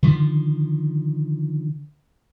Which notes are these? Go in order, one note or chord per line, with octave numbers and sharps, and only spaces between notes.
D3 D#3 F3